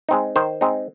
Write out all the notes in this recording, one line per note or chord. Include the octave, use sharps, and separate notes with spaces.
G#3 C4 D#4
D#3 C5
G#3 C4 D#4